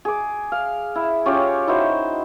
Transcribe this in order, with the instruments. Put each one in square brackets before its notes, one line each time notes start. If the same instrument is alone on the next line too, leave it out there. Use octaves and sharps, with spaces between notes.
[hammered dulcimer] G#4 D6
F5
E4
C#4 F4 G4 C#5
D#4 E4 F#4 C5